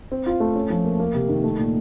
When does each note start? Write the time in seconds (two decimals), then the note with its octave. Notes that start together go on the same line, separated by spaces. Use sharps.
0.12 C4
0.26 F4
0.40 A3
0.55 C#4
0.70 F3
0.85 A#3
1.00 A#3
1.14 C3
1.29 D#3
1.44 A3
1.59 A#2